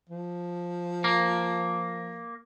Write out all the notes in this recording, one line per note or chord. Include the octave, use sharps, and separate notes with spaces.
F3
A#3